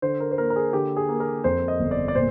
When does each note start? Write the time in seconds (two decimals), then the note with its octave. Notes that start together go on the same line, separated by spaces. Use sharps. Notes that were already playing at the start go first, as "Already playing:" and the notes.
0.02 D3 C5
0.20 A#4
0.31 C5
0.38 A#3 A#4
0.50 A#4
0.56 G#4
0.73 D3 G4
0.97 G#4
1.09 A#3
1.20 A#4
1.44 F2 C5
1.68 D#5
1.80 G1
1.91 D5
2.08 D5
2.15 A#2 C5